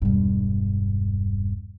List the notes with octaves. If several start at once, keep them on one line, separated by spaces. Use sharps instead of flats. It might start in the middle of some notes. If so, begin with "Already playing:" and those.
E1 G2